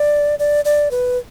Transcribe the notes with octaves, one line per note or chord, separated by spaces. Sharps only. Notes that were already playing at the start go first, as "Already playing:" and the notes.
Already playing: D5
D5
D5
B4